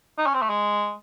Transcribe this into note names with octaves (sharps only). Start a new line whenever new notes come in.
D#4
C#4
C4
A3
G#3